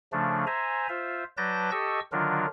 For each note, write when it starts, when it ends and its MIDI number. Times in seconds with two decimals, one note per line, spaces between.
0.12 0.45 49
0.12 0.45 53
0.12 0.45 57
0.12 0.45 62
0.47 0.88 72
0.47 0.88 76
0.47 0.88 80
0.47 0.88 82
0.89 1.24 65
0.89 1.24 72
0.89 1.24 76
1.37 1.70 54
1.37 1.70 71
1.37 1.70 74
1.37 1.70 81
1.37 1.70 91
1.37 1.70 94
1.72 2.00 67
1.72 2.00 69
1.72 2.00 75
1.72 2.00 85
1.72 2.00 88
2.12 2.46 50
2.12 2.46 51
2.12 2.46 54
2.12 2.46 62
2.12 2.46 65
2.12 2.46 70